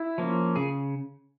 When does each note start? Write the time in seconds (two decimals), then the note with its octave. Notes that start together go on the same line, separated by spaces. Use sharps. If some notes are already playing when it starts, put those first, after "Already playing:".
Already playing: E4
0.18 F3 A#3 C#4
0.56 C#3 G#4